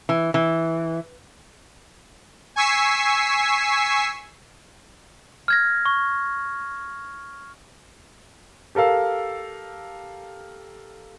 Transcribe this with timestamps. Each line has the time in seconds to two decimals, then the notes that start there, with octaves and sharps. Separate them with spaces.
0.09 E3
0.34 E3
2.56 G#5 C#6 E6 B6 C7
5.48 F6 G#6 A#6
5.86 C#6
8.75 G4 A4 A#4 F5 E6